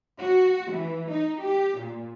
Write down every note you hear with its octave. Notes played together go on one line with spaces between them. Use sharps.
F#4
E3
D#4
G4
A#2